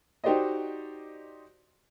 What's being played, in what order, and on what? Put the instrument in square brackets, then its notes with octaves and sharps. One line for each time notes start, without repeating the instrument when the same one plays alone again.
[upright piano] D#4 F#4 G4 C5 D5 D#5